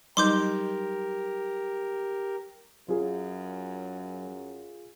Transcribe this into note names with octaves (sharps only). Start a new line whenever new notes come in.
F#3 G3 D#4 G4 A#4 C6 D6 G6
F#2 F#3 F4 G#4